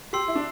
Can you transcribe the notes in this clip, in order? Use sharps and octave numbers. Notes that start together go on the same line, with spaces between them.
G4 C6 E6 C7
E4
D4